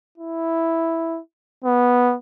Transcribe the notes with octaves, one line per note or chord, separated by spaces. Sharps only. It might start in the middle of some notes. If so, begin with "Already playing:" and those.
E4
B3